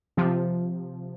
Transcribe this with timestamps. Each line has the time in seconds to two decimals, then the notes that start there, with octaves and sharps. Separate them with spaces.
0.17 C3 F3